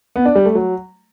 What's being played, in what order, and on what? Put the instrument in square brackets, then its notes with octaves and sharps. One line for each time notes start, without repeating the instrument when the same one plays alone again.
[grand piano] B3
D4
G3
A3
F#3